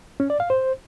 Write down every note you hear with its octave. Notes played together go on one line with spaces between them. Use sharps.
C#4
D5
F5
C5